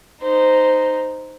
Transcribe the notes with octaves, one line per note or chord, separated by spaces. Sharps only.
D#4 C5